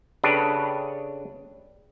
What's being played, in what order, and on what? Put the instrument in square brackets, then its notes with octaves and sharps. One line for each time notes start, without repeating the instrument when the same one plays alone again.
[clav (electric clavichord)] C#3 D4 G4 A4 B4